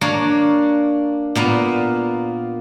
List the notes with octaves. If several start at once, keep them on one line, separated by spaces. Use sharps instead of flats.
A#3 D4 C#5
A#2 A#3 B3